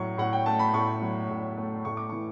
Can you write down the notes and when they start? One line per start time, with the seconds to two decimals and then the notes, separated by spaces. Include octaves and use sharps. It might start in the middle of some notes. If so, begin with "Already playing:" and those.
Already playing: A2 F#3 C#6
0.18 A2 F#5
0.33 G5
0.46 A3 A5
0.59 B5
0.73 A2 C#6
1.01 F#3
1.29 A2
1.57 A3
1.85 A2 C#6
1.97 D6
2.09 E3 C#6